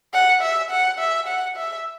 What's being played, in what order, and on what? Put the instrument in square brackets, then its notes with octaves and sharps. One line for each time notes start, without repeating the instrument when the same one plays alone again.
[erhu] F#5
E5
F#5
E5
F#5
E5